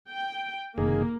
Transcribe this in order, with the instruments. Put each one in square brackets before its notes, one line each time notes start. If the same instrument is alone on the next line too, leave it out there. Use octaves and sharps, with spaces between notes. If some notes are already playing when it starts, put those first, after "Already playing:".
[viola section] G5
[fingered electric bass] F#1 C3 [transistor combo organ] D#3 G#4 [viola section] A#3